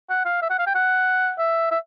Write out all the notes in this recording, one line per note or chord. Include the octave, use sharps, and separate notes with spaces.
F#5
F5
E5
F#5
F5
G5
F#5
E5
E5